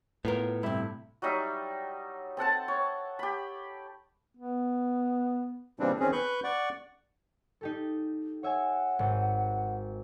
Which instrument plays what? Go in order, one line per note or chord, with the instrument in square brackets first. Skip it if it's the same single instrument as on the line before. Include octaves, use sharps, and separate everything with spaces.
[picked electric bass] A2 [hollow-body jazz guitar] B3 F4 A#4
[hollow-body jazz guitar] G2 C3 [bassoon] E4
[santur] F#3 G3 D#4 E5
C4 A4 F#5 A5
C#5
G4 B5
[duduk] B3
[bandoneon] A#2 C#3 E3 G3 C4 D4
E2 D#3 C4 C#4 G#4
B4 C#6 F#6 G6
D5 F#5 C#6
[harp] D#4 G4 A4
[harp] C#5 E5 G#5 [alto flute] F#5
[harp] G#1